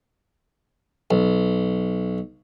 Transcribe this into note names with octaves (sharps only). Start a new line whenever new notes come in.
B1